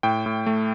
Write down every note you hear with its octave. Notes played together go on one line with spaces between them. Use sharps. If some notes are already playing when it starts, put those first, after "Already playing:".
A2 G5
A2
A3